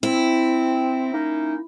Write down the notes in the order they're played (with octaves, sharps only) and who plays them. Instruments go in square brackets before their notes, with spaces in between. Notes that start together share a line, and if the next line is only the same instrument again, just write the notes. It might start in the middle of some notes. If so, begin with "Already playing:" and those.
[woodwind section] C4 [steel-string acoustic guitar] E4
[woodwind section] A#3 C#4 D#4